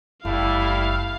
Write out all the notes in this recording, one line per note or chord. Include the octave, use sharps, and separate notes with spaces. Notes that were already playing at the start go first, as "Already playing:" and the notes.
F#1 G3 A3 E4 F5